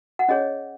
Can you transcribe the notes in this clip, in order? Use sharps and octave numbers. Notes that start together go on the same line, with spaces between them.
F#5
C#4 G#4 C#5 D#5